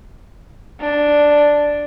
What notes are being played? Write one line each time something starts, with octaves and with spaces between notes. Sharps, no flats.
D4